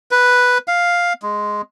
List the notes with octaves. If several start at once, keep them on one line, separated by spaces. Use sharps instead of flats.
B4
F5
G#3